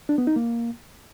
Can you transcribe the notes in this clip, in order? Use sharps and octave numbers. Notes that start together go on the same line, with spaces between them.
D4
B3
D#4
A#3